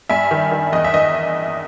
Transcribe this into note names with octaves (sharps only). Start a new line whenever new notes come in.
G2 E5 G#5
D#3
D#3
E2 D#5
E5
D#3 D#5